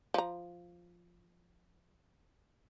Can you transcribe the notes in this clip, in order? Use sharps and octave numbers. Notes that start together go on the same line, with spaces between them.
F3 A#5